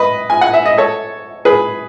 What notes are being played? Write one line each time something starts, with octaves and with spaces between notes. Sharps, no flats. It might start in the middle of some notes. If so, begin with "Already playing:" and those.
Already playing: B4 D#5
G#5
F#5
E5
D#5
A4 C#5
G#4 B4